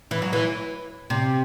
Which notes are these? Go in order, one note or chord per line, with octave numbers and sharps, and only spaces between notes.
E3
F#3
E3
C3